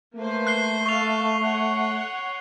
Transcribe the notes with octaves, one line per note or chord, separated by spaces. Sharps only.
A3 A#3 B4 C5
F#6 C7 G7
A4 F5 C#6 F7
C#5 F#5